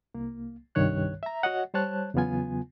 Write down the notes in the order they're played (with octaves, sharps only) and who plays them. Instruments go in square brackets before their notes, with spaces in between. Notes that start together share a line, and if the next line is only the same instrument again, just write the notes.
[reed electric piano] C2 A#3
C2 G2 D#3 C#5 F#6
E5 A#5
F#4 C#5 D#5 F#5
G3 C5 C#5 A5 F#6
E2 C#3 F#3 B3 F4 G#5